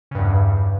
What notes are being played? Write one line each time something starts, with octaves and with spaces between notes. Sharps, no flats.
E2 G2 C#3